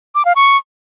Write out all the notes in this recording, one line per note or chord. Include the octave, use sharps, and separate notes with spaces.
D6
F5
C#6